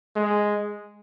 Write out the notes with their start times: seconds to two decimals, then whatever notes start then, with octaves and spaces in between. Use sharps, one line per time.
0.16 G#3